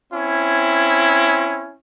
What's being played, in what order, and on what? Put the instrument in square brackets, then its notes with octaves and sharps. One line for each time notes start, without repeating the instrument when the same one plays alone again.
[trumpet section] C4 C#4 E4